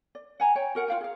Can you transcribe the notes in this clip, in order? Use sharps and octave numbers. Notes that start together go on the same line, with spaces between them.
D5
F#5 G#5 A#5
C#5 G5
F#4 A#4 F#5
F4 F5 G5
G#4 F5